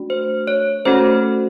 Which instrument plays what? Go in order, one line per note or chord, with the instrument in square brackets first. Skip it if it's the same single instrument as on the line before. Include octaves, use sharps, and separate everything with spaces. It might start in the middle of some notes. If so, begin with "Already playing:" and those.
Already playing: [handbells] A3 D4 F#4
C5
C#5
A3 C#4 F#4 A4 C5